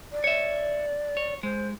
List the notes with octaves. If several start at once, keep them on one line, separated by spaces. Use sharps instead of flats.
D5
C#5 E5
C#5
G#3 C5